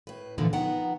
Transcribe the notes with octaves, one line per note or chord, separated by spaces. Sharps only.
A2 B4
G2 A#2 D3 E3 F3
D#3 F3 B3 F#5 A#5